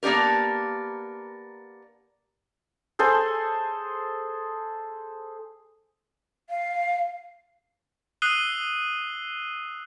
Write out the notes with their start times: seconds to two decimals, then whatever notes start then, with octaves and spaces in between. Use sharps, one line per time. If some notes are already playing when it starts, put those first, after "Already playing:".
0.03 A#3 B3 D4 G4 A#4
2.99 G#4 A4 C5 G#5
6.50 F5
8.22 D#6 E6 F#6 C7 D#7 G7